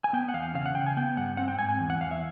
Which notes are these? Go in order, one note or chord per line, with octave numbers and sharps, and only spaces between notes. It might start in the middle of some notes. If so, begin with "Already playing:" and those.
G#5
B3 G5
F#5
E2 F5
C#3 F5
F#5
C#3 G5
G#5
B3 G5
G2 F#5
C4 F#5
G5
G#2 G#5
G#5
E2
F#5
E2 F5
E5